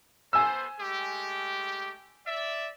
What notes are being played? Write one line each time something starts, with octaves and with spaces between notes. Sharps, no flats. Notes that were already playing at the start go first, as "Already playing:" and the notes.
B3 A4 C5 G#5 E6
G#3 A3 G4
D5 E5